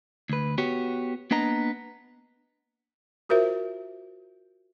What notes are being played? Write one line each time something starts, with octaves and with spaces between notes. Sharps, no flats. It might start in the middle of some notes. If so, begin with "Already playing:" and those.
D2 B4
B3 F#4 G4 C#5
A#3 B3 D4 D#5 A#5
F4 F#4 A#4 C5 E5